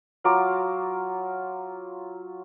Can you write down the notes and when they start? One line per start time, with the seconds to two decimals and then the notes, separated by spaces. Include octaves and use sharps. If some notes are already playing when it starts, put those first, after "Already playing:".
0.24 F#3 F4 A#5 D6